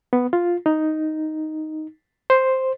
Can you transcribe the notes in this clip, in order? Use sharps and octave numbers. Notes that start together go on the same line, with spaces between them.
B3
F4
D#4
C5